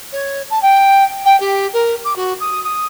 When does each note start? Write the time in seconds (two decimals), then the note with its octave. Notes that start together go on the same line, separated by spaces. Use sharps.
0.12 C#5
0.50 A5
0.62 G5
1.25 G5
1.40 G4
1.73 A#4
2.04 D6
2.16 F#4
2.40 D#6
2.64 D#6